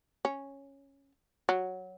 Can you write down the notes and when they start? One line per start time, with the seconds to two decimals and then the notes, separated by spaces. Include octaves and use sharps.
0.25 C#4
1.49 F#3